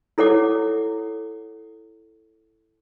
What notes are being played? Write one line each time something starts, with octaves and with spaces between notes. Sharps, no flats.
E4 A4 C#5 F#5 D6